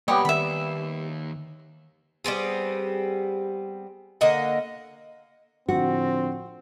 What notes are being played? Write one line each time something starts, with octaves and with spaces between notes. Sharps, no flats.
G3 A#3 B3 G4 C#5 G#5 D#6
D#2 E5 B5
G3 B3 C4 G#4
D3 A#3 D#5 F#5
A2 D3 F3 C4 F#4